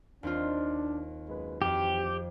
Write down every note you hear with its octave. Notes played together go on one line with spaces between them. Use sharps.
D#2 C4 D4 F4
F#2 G#3 B4
F2 E3 C4 F#4 G4